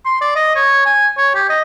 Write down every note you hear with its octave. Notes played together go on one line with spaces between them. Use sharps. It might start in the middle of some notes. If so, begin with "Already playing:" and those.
C6
D5
D#5
C#5
G#5
C#5
G4
D#5